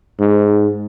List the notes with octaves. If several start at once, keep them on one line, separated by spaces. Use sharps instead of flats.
G#2